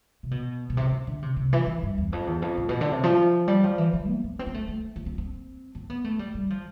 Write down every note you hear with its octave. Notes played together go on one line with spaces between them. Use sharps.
C3
B2
B2
C3
D3
D3
C3
C3
E3
E3
G2
E2
F2
E2
F2
A2
B2
D3
C3
F3
G3
F3
E3
F3
B3
B3
C4
B3
A3
A3
C4
C4
C4
C4
B3
A3
G3
G3
F3